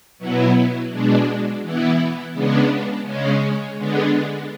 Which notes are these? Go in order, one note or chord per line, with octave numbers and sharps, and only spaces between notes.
B2 F#3 B3 E4
B2 G#3 D4
E3 B3 E4
C#3 G#3 B3 D4
C#3 G#3 C#4
D3 G#3 B3 D4